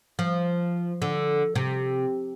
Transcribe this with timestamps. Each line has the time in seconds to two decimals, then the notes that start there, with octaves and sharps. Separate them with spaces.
0.19 F3
1.02 D3
1.55 C3